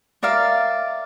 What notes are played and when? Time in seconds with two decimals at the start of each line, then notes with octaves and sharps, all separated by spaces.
0.23 A#4 D5 E5 F5